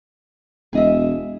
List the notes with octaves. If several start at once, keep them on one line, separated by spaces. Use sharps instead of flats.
E1 G#4 D#5 E5